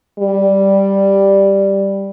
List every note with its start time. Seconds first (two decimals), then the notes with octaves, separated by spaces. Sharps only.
0.19 G3